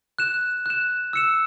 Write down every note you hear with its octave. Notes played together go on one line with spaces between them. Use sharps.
F#6 E7
F#6 E7
E6 C#7 E7